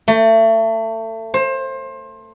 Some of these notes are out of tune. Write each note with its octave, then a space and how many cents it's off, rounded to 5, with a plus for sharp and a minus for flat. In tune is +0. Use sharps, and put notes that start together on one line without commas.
A3 +30
C5 +25